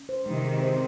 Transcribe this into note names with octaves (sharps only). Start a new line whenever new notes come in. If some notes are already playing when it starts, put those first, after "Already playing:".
Already playing: C#4
C5
C3 D#3 G#3
G#4
C5